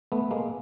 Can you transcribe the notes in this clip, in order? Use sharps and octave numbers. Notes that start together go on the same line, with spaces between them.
A3 B3
G#3 A#3